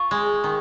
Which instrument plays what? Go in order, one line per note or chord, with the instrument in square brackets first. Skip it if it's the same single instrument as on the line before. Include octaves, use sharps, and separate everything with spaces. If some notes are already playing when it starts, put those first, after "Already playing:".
Already playing: [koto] F4 [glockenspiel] C#6
[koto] G#3
D#3